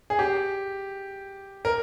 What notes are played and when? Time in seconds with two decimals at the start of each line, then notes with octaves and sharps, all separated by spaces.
0.10 G#4
0.19 G4
1.65 A#4